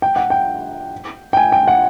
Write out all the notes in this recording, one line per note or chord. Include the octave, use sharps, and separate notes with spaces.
G5
F#5
G5
G5
G#5
G5
F#5